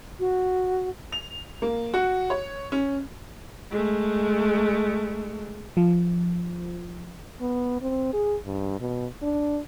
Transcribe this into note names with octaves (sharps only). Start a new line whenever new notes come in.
F#4
F7
A#3
F#4
C#5
C#4
G#3 A3
F3
B3
C4
G#4
G2
B2
D4